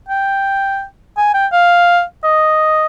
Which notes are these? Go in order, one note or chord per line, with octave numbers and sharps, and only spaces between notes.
G5
G#5
G5
F5
D#5